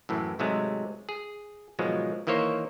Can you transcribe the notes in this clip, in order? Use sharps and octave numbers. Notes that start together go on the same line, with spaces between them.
F#2 A2 E3
G#2 C3 F#3 G#3 A3
G#4
G#2 B2 D#3 F3 F#3 G#3
D#3 E3 A#3 C5 C#5